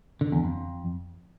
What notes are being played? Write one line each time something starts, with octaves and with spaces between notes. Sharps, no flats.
D3
E2
F2